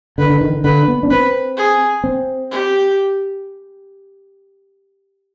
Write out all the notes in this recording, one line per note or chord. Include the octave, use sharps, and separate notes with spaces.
D3 B4
D3
D#3
D3
D3 B4
B3
D4
C4 B4
G#4
C4
G4